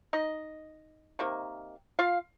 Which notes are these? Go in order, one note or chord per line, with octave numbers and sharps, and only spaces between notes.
D#4 D#5
C3 D#3 A#3
F4 F5